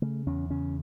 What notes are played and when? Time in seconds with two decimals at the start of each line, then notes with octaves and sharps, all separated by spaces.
0.02 C#3 A3
0.27 E2 C#4
0.50 C#3 C#4